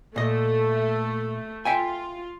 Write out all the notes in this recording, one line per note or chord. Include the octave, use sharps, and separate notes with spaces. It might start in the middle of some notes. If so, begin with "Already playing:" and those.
A#2 A3 D#5
F4 E5 G5 G#5